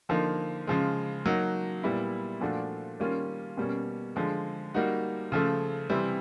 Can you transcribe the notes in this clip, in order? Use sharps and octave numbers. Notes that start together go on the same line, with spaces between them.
D3 F3 A#3 D#4
C#3 F3 G#3
F#3 A#3 D#4 F#4
A#2 G3 B3 E4
A#2 F3 A3 D4 F#4
D#3 G3 A#3 C#4 F4
B2 G3 A#3 C#4
D3 F3 G#3
G3 A#3 D#4 F#4
C#3 F3 A3
C3 E3 G3 C4 E4